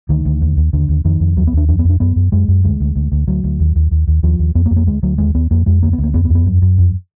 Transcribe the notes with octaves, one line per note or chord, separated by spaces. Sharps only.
D2 D#3
D2
D#2
D#2
D#2 D3
D#2
F2 D#3
F2
D#2 F#3
B3
D#2 D4
F2 D4
B3
F2 D4
F#2 B3
F#2
F#2 G#3
F#2
D2 G#3
D2
D2
D2
D2 F#3
D2
D#2
D#2
D#2
D#2
D#2 F3
D#2
F2 B3
A#3
F2
A#3
D2 G#3
D2 F#3
D#2 G#3
D#2 B3
F2 A#3
F2 G#3
D2 A#3
B3
D2
A#3
F2 B3
B3
F2
B3
F#2
F#2
F2